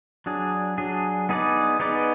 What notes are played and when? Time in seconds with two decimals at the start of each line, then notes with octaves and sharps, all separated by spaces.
0.26 F#3 D4 G#4
0.78 F#3 D4 G#4
1.29 B3 D#4 G#4 B4 D5
1.80 B3 D#4 G#4 B4 D5